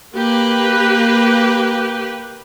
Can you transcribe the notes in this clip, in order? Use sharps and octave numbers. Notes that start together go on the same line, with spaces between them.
A#3 G4 B4